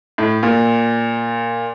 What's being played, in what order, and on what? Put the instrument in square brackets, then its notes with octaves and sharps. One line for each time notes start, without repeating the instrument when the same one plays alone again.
[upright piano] A2
A#2